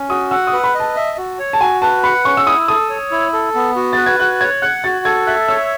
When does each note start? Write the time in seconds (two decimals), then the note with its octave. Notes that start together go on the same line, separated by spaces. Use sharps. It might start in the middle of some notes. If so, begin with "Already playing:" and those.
Already playing: C#4
0.09 F#4 D#6
0.31 F#5 E6
0.47 D#6
0.53 B4
0.64 B5
0.75 D#5
0.80 A5
0.96 E5
1.18 F#4
1.39 C#5
1.53 A5
1.61 F#4 G#5
1.82 B4 A5
2.04 F#5 B5
2.25 C#4 C#6
2.37 E6
2.47 E4 D#6
2.68 A4 D#6
2.90 C#5
3.11 E4
3.33 A4
3.55 B3
3.76 F#4
3.93 B4 A6
4.06 G#6
4.19 F#4 F#6
4.41 C#5 G#6
4.62 F#5 F#6
4.84 F#4 A6
5.05 A4 G#6
5.27 E5 F#6
5.48 C#5 E6